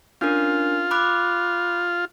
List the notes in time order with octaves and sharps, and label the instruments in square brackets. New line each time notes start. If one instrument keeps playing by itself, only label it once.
[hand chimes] C#4 D4 A#4 [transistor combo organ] F4
[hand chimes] B5 D6 F#6